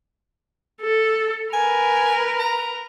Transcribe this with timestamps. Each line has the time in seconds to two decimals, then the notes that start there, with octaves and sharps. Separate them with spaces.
0.81 A4
1.53 A#4 B4 G#5
2.39 A#5